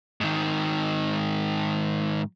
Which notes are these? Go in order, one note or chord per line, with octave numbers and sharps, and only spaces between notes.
G#2 D#3